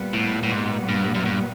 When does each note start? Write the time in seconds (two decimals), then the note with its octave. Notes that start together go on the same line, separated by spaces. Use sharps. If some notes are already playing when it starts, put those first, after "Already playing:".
Already playing: A#2 G3 B3
0.13 A2
0.43 A2
0.51 G#2
0.89 G2
1.14 F#2
1.25 G2